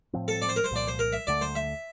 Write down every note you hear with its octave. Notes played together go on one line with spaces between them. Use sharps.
A2 F3 C4
A4
D5
C5
A#4
C5
C2 A#2 F3 D5
C5
A#4
E5
D2 D3 A3 D5
C5
E5